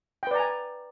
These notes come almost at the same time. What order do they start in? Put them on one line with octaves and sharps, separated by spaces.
G5 B4 D5 A#5 G#5